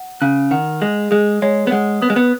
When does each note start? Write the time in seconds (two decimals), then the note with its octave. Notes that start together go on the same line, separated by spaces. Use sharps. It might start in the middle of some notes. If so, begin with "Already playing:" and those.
Already playing: F#5
0.21 C#3 F#6
0.51 D#3 F#5
0.81 G#3 G#4
1.11 G#3 G#4
1.42 G#3 C#5
1.67 B3
1.71 G#3 F#5
2.02 B3 D#6
2.10 G#3
2.16 B3